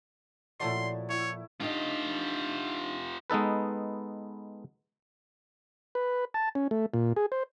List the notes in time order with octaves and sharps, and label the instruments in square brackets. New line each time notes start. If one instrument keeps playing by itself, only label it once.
[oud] A#2 F3 D5 [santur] F#3 A3 E4 [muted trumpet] C6
[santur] E4 [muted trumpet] C#5
[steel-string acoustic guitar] D4 D#4 D#5 [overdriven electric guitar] F4 G4
[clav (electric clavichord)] G#3 B3 D#4 A4 B4
[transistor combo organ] B4
A5
C#4
A3
A#2
G#4
C5